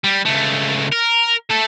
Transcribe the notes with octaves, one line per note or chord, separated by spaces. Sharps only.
G3
C#2 A3
A#4
A3 A4